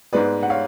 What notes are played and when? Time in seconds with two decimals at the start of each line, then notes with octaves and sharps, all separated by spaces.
0.13 G#2 G#3 B3 B4 D5
0.43 F#5
0.50 C#5 F5